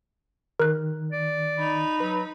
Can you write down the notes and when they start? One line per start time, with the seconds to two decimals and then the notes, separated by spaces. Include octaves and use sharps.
0.60 D#3 A#4 F#6
1.12 D5
1.58 D#4 B5
2.00 F#3 B4